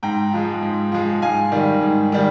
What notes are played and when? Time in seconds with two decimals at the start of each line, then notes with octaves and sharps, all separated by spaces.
0.03 G#2 G5 A#5
0.33 F3 G#3
0.62 G#2
0.92 F3 G#3
1.22 G#2 F5 G#5
1.52 D#3 G3
1.82 G#2
2.12 D#3 G3